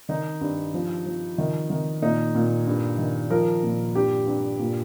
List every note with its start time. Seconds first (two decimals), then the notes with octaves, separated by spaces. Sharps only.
0.09 D#3 D#4
0.41 G2
0.74 F3
1.06 F3
1.38 D#3
1.70 D#3
2.02 A#2 D#4
2.35 A#2
2.67 G2
2.98 D#3
3.30 F3 A#4
3.63 A#2
3.95 G2 G4
4.27 G2
4.59 A#2